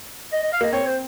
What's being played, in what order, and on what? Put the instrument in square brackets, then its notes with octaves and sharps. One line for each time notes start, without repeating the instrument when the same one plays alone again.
[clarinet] D#5
D#5
F5
[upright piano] A#3 [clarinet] D#5
[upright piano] C4 [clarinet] C#5
[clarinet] C5